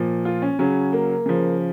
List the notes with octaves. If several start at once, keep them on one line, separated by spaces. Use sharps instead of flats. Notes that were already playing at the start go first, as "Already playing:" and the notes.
Already playing: A#2 F3
F4
C#4
C#3 F#3 C#4
A#3
C#3 F3